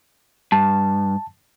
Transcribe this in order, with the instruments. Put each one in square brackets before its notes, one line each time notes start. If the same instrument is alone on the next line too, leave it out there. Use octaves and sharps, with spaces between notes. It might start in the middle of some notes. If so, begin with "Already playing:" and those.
[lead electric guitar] G2 [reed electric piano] A5